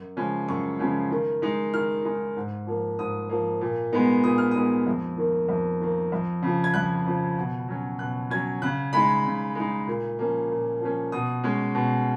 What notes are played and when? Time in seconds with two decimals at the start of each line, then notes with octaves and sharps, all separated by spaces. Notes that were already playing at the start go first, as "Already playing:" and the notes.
Already playing: F#2
0.17 C#3 F3 G#3 C#4
0.49 F#2 C#6
0.79 C#3 F3 G#3 C#4
1.11 D#3
1.42 G#3 D#4
1.74 D#3 F6
2.05 G#3 D#4
2.37 G#2
2.67 F3 A#3
2.99 G#2 D#6
3.29 F3 A#3
3.61 A#2
3.93 G#3 B3 D#4
4.23 A#2 D#6
4.38 F6
4.51 G#3 B3 D#4 D#6
4.87 F2
5.17 D#3 A#3
5.49 F2
5.81 D#3 A#3
6.12 F2
6.43 C#3 F3
6.64 G#6
6.74 F2 F#6
7.06 C#3 F3
7.37 B2
7.68 F#3 C#4
7.99 B2 F#6
8.31 F#3 C#4 G#6
8.62 C#3 F#6
8.93 G#3 D#4 B5
9.25 C#3
9.55 G#3 D#4
9.87 A#2
10.18 F3 A#3 C#4
10.50 A#2
10.81 F3 A#3 C#4
11.12 B2 D#6
11.44 G#3 C#4
11.75 B2